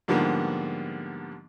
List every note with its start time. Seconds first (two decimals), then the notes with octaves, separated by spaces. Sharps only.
0.08 G#2 D3 F3 G3 A#3 B3